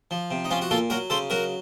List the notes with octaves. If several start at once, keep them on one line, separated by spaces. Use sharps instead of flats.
F3
C3
D#4
F3 C#4 F4
F#4
A#2 F4 A4
F#3 F#4 A#4
C#3 A4 C5
F#3 F#4 A#4